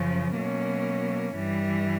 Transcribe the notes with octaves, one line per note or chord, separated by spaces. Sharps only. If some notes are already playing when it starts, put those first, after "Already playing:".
Already playing: F#2 C#3 F3
B2 F#3 A#3 C#4
G2 E3 G3